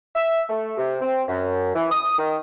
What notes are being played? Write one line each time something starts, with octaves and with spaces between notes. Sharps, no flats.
E5
A3
C3
C4
F#2
E3
D#6
D#3